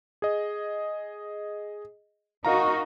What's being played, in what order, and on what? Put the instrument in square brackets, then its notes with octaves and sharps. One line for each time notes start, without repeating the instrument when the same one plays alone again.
[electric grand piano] G#4 D#5
[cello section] D#4 F#4 [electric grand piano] A#4 F5 A#5